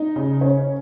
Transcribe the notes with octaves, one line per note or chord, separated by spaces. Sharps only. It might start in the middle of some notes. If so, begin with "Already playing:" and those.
Already playing: D#4
C#3
C#4